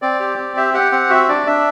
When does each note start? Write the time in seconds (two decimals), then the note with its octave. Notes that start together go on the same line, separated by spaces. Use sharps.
0.02 C4 D5
0.20 G4
0.38 C4
0.57 G4 E5
0.74 G4 F#5
0.92 C4 F#5
1.10 F#4 E5
1.29 D4 D5
1.47 D4 E5